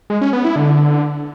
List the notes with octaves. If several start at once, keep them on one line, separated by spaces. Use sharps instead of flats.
G#3
C#4
B3
E4
D3